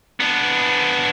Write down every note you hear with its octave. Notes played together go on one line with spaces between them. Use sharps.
B3 D4